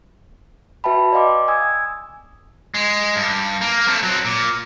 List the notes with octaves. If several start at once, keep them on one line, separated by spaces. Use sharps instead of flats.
F#4 B4 E5 G5 A5 B5
D5 D#5 F5 G5 C6 D6
G#5 D#6 E6 G#6
G#3
G2
A#3
A3 C4
F#3 C4
A#2